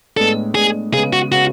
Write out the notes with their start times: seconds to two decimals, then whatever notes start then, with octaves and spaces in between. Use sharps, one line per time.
0.17 A2 G#3 B3 D4 A4
0.55 A2 G#3 B3 D4 G#4
0.93 C#3 G#3 B3 G#4
1.13 F#4
1.32 C#3 G#3 B3 F#4